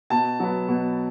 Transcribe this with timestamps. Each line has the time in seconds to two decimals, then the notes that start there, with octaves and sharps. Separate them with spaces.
0.10 B2 A5
0.40 F#3 B3
0.68 B2